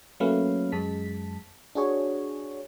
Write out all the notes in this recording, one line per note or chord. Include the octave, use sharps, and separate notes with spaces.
F#3 A3 A#3 C#4 B4 F5
F#2 G#3 A5 B6
D4 F#4 G#4 C#5